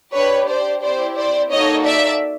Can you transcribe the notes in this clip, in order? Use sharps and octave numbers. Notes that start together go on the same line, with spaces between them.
D4 G4 B4 C#5
C5 D5
C4 E4 G4 C5 D5
C5 D5
A#3 D#4 F#4 A4 C#5 D#5
D5 E5